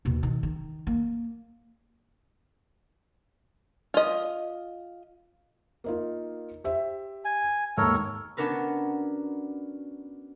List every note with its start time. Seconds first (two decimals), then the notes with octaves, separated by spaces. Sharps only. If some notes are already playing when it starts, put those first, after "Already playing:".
0.05 D#2 B2
0.23 D#3
0.43 D#3
0.87 A#3
3.94 F4 D#5
5.84 A#3 D#4 F4
6.64 G4 C5 E5
7.25 G#5
7.77 D#2 G#2 A4 A#4 C#5
8.37 B3 C#4 D4 F#4 A#4 B4